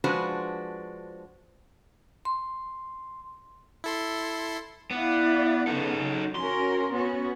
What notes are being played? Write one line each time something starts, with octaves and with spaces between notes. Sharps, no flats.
F3 G#3 D4 F#4 B4 C5
C6
E4 A4 C6
B3 E4 D5 F5
C#3 B3 D#4 A4
F#3
C#4 F#4 A#4 C6
B3 C#4 F#4